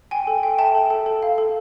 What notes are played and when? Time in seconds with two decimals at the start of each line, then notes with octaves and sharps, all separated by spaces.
0.11 G5 G#5
0.27 A4
0.43 G5
0.58 E5 G5 A5
0.75 A4
0.90 A4
1.06 A4
1.23 F5
1.38 A4